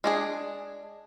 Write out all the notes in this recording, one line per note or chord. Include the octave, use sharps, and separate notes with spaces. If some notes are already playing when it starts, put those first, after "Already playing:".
G#3 D4 G#4